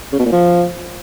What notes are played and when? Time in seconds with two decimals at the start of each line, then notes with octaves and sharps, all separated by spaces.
0.13 C#3
0.19 B2
0.26 A#2
0.32 F3